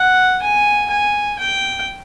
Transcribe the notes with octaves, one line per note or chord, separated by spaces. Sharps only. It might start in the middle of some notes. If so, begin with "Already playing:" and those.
Already playing: F#5
G#5
G#5
G5